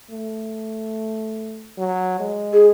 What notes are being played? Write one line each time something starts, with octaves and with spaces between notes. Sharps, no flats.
A3
F#3
G#3
G#4